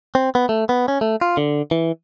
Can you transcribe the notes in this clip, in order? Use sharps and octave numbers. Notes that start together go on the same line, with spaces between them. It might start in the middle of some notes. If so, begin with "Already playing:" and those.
C4
B3
A3
B3
C#4
A3
F4
D3
E3